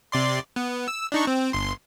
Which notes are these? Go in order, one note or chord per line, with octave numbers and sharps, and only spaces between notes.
C3 D5 C6
B3
E6
D4 D#4 C#6
C4
G1 C6